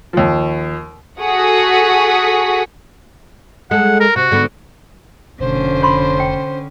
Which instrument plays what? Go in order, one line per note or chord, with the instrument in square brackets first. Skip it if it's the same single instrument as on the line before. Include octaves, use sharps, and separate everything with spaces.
[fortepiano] D#2 F3
[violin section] F#4 G#4 A4 C#6 D#6 B6
[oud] G#3 A4 [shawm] F#5
[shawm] A#4
[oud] C3 [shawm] F#4
[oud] G#2 D3 B3
[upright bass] F1 B2 [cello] D3 C#4 [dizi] C5
[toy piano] C#5 B5 C6
D4 G5